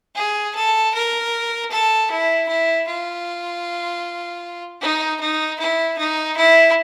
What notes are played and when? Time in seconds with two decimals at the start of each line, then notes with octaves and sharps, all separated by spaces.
0.16 G#4
0.55 A4
0.94 A#4
1.71 A4
2.10 E4
2.48 E4
2.87 F4
4.81 D#4
5.20 D#4
5.59 E4
5.98 D#4
6.37 E4